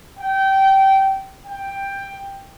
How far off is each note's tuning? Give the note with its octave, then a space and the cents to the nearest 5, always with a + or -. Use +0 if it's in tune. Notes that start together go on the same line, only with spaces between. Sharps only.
G5 -20
G5 +10